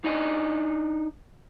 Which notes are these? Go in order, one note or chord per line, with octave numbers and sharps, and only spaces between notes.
D4 D#4 D5 D#5 G#5